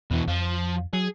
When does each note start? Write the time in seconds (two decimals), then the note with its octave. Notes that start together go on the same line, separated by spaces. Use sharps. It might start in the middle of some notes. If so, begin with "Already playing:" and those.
0.11 E2 B2 E3
0.28 F2 F3
0.93 F#3 G#4